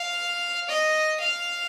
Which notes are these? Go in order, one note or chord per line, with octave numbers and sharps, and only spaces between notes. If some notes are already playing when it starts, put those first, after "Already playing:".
Already playing: F5
D#5
F5